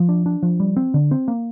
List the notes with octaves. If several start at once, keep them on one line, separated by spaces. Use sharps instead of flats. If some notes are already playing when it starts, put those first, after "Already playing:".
Already playing: F3
D4
D4
F3
G3
C4
D3
C4
A#3